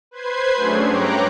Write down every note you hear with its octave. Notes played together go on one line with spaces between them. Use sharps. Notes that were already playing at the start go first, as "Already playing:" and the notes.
B4 C5 G#6 C7
F#3 A3 C#4 D4 G#4
G2 C#5 G5 A#5 D6 F#6